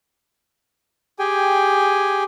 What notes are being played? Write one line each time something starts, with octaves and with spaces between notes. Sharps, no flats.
G4 G#4 G5 G#5